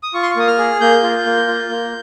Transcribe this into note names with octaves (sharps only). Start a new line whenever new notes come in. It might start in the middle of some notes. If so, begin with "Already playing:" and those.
D#6
F4 C#6
C6
C#6
A#3 D#6
F6
G#4
A#3 G6
F4
A#3
F4
A#3